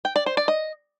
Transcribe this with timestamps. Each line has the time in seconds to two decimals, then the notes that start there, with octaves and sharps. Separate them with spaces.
0.05 G5
0.16 D5
0.26 C5
0.37 D5
0.48 D#5